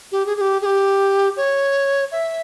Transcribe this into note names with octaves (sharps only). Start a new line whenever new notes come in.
G4
G#4
G#4
G4
G#4
G4
C#5
E5